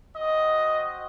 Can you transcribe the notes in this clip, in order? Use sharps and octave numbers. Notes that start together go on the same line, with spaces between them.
C4 F#4 D#5